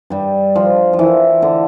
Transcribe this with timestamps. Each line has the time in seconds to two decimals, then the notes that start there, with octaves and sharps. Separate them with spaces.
0.10 G2 G3
0.56 F3
0.93 F3
0.99 E3
1.42 D3